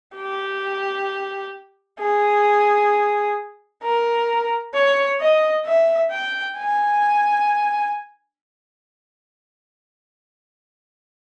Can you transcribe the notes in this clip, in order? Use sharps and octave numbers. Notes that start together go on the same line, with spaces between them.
G4
G#4
A#4
C#5
D#5
E5
G5
G#5